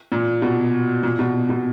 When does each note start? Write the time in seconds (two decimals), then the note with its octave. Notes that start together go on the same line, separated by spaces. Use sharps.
0.12 A#2
0.42 B2
1.03 A#2
1.19 B2
1.49 B2